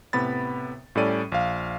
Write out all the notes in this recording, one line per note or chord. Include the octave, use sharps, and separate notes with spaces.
A2 C3 B3 B5 A6
A2 G3 C#4 A4 D5 D#7
A#1 F5